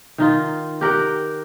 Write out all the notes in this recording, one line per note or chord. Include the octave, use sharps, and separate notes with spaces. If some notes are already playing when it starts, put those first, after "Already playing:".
D#3 D#4 F4
G4 A#4 F#5 G5